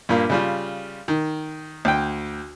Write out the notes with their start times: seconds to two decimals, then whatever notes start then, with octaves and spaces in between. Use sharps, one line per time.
0.09 G2 A#2 A#3
0.30 C#3 G3 F4
1.08 D#3
1.85 D2 G5